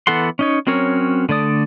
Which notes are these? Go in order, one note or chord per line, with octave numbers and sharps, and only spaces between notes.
E3 B3 A4 F#5 C6
C#4 D#4 C#5
F#3 C4 C#4 A#4 C#5
D3 A3 D5 D#6